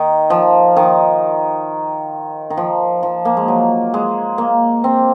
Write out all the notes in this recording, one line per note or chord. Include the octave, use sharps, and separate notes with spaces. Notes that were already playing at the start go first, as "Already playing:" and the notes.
Already playing: D#3
F3
D#3
D#3
F3
F3
A#3
G#3
F#3
G#3
A#3
C4